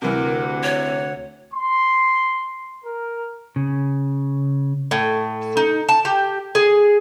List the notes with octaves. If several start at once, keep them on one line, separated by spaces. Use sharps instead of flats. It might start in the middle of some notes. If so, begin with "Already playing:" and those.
D2 C3 E3 A#4 F#5
C#5
C6
A#4
C#3
A2
D#4
A5
G4
G#4